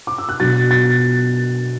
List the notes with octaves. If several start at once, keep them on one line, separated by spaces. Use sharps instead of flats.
D6
E6
F#6
B2 F#3 D4 A6
A6